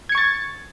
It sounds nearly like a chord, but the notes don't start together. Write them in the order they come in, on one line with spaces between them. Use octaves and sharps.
G#6 C#7 C#6 A6